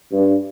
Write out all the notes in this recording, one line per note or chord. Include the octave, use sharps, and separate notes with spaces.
G2